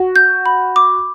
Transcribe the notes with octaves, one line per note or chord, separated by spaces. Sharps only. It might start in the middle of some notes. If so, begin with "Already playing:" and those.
Already playing: F#4
G6
B5
D6